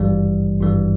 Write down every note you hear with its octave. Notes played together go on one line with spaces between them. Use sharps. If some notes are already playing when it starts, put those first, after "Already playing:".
Already playing: G#1 G2 E3 G3
G#1 G2 E3 G3